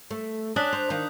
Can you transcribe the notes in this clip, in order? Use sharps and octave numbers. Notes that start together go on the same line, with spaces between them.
A3
C#4 D4 D#6 F#6 B6
C5 F7
D#3 F4 G6